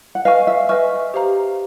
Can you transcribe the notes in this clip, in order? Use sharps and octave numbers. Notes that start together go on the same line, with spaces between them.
F#5
B4 D#5 F5 G#5 C#6 F6
E5
B4 D#5 E5 G#5 C#6 F6
G4 C5 F5 A#5